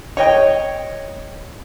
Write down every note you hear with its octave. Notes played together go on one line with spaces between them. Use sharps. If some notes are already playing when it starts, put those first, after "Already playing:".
C#5 D#5 G5